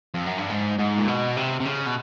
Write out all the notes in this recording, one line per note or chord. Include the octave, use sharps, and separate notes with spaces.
F2
F#2
G2
G#2
G#2
A#2
B2
C3
C3
C#3
B2